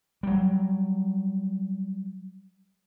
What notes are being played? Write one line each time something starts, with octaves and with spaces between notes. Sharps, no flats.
F#3 G3